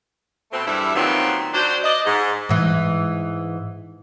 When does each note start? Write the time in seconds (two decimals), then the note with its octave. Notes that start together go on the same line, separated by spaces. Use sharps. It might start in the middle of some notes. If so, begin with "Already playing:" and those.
0.52 B2 A3 C4
0.66 E2 G2 G3 E4 A4 E5
0.95 A#2 D#3 F3 F#3 B3 C4
1.53 F#3 D4 C5
1.83 D5 D#5
2.05 G#2
2.49 G#2 E3